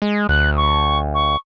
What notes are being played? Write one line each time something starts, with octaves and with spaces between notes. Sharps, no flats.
G#3
D2 F#6
C#6
C#6